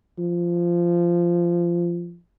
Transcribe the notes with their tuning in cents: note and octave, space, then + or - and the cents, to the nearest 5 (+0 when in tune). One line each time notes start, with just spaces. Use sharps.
F3 -15